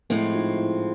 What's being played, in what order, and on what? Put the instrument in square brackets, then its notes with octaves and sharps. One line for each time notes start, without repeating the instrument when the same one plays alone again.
[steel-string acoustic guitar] A2 F3 G#3 C4 [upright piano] E4
[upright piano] D#4 F4
E4